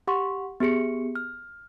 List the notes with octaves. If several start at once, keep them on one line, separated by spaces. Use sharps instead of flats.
G4 F#5 C6 C#6
B3 G4 G#4 C#7
F6